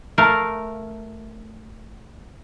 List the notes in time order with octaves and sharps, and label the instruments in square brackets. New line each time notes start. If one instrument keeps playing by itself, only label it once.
[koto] A3 A#4 F5